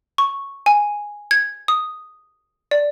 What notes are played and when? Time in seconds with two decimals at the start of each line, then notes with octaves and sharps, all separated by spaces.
0.18 C#6
0.66 G#5
1.31 G#6
1.68 D#6
2.71 D5